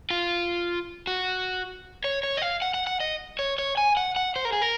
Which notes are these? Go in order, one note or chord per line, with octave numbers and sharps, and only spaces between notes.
F4
F#4
C#5
C#5
D#5
F5
F#5
F#5
F#5
D#5
C#5
C#5
G#5
F#5
F#5
C5
A#4
G#4
A#4